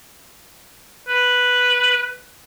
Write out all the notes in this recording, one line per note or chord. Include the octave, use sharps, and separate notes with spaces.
B4